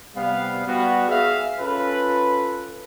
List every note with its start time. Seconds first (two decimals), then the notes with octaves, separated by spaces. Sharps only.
0.16 C3 G3 B3 F5
0.66 G3 B3 F#4
1.08 G#4 E5 F5
1.60 C#4 F4 A4 B4